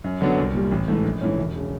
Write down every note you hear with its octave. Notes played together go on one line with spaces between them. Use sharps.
F#2
D3 F#3 B3 D4
C2
A#2 G3
A1
G#2 E3 A3
A#1
G#2 E3 A3 C#4
E1
C#3